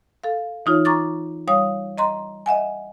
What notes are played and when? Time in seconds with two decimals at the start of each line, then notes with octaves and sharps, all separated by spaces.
0.24 A4 F5
0.66 E3 D#4 F4 C#5
0.85 A#5 C#6 D6 A6
1.48 G3 C#5 F5 D#6
1.98 D#5 A#5 C6
2.46 D#5 E5 F#5 G#5